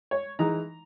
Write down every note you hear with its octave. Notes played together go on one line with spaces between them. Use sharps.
C#5
E3 G#3 D#4 A#5